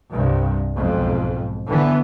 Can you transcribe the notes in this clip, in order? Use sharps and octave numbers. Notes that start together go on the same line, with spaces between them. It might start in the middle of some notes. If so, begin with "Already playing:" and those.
C2 G2
B1 F2 G#2
D3 E3 B3